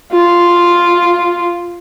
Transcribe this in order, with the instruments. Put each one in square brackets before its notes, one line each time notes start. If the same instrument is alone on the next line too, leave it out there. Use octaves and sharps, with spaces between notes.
[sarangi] F4